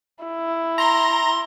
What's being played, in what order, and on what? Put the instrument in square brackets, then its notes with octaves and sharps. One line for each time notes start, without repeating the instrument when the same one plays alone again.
[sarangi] E4
[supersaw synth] A#5 [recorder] C6